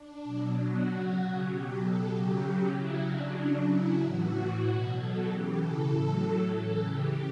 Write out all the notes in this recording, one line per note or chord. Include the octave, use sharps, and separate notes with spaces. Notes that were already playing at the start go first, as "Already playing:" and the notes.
Already playing: D4
B2 F#3
F#4
C#3 F#3
B2 F#3 G4
A4
C#3 F#3 G4
C#3 F#3 E4
D4
C#3 F#3
E4
A2 E3 F#4
B2 F#3
A4
C#3 E3 G4
A4
A2 F#3
C#3 E3 A4
G4